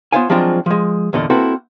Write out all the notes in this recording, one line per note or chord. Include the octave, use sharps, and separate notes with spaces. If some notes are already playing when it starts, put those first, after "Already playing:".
B3 F4 C5 C#5 F5 G#5
F3 F#3 G#3 C4 D4 F4
F3 G#3
E2 A#2 D3 D#5
A#3 C4 E4 F#4 A4 B4